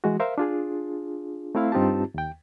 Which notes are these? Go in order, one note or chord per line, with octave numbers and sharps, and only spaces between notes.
E3 G#3 F#4
A#4 C5 E5 F5
D4 F4 G#4
A3 C4 E4 F5
G2 C4 D#4 F4 G4 A5
D#2 G5